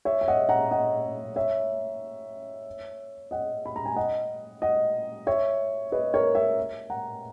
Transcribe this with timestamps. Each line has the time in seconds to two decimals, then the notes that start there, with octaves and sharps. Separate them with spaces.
0.05 C#5 E5
0.21 E5
0.28 D#5 F#5
0.49 F#5 A#5
0.71 D#5 F#5
1.36 C#5 E5
3.31 D#5 F#5
3.66 B5
3.76 A#5
3.86 G#5
3.96 D#5 F#5
4.62 D#5 F#5
5.27 C#5 E5
5.92 B4 D#5
6.14 A#4 C#5
6.35 C#5 E5
6.90 F#5 A#5